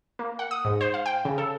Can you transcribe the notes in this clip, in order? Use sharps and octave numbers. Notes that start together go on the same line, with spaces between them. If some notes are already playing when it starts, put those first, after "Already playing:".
A#3
F#5
D#6
G#2
C5
F5
G5
C#3
A4